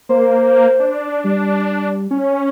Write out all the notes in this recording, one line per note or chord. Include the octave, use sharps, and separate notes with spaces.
A#3 C5
D4
G3
C#4